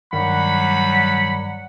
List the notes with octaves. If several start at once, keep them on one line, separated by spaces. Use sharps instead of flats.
G2 D#3 F#3 G3 F#5 B5